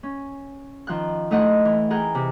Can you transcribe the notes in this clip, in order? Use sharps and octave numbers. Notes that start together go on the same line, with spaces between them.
C#4
D#3 F3 G5 F#6
A3 D#4 E4 D#5 F#5
E3
G#4 A#4 F#5 G5
C3